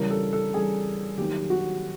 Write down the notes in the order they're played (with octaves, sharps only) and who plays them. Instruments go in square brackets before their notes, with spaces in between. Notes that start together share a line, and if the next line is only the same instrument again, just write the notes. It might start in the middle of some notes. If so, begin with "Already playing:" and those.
Already playing: [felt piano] C#3 E3 G3 [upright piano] A#4
[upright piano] A4
A4
[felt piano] C#3 E3 G3 [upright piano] G#4
[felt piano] D#3 F#3 A#3 D#4 [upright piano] G4
[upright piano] F#4